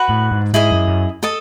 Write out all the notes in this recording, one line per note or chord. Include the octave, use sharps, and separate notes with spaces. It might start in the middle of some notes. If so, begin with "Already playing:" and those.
Already playing: F#4 B4 F#5 B5
A2
G#2
G#2 E4 G#4 D#5
F#2
F#2
A4 D#5 A5